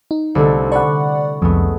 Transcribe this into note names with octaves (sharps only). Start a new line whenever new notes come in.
D#4
C2 D3 A3
D5 F#5 B5 C#6
C2 F2 G#3 A3 B3